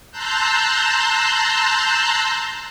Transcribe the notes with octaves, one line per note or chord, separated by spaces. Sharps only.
A5 A#5 C6 E6 F#6 G6